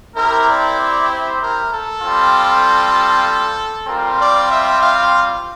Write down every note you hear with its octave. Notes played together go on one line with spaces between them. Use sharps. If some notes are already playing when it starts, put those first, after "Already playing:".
C4 E4 G4 A#4
D5
D5
C5
A#4
A4
G3 C4 F4
G3 C4 F4 A#4
D5
E5
F5